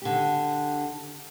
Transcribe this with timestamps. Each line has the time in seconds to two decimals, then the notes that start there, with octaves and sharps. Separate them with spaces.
0.02 D3 G4